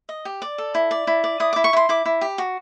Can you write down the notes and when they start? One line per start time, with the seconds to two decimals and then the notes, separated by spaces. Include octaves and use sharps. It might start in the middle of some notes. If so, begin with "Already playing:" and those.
0.09 D#5
0.25 G4
0.42 D5
0.58 A4
0.75 E4
0.91 D5
1.07 E4
1.24 D5
1.40 E4 D#6
1.53 E4 D6
1.64 C#6
1.73 E4 C6
1.89 E4 D6
2.06 E4
2.21 G4
2.38 F#4